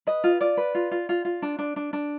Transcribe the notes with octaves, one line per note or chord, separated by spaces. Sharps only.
B4 D#5
F4
F4 D5
B4
F4
F4
F4
F4
D4
D4
D4
D4